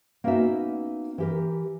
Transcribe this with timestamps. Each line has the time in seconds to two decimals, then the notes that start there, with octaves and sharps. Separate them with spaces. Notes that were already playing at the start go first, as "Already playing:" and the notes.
0.24 A#3 B3 C#4 D#4 F#4 E5
1.18 E3 G4 A#4